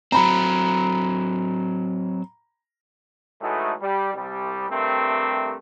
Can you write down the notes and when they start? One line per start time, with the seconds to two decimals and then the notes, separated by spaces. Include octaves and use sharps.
0.12 F#3 C4 A#5 B5
3.41 A2 E3 G#3 A3 D#4 F#4
3.81 G3
4.14 C2 G3
4.70 G2 C3 A3 C4 G4 A#4